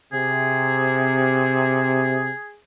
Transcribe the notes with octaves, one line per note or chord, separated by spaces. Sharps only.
C3 G#4